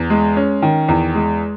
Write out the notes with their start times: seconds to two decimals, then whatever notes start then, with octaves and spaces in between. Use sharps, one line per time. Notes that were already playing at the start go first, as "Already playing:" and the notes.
Already playing: E2
0.10 G#3
0.37 C#4
0.62 D#3
0.88 E2
1.15 G#3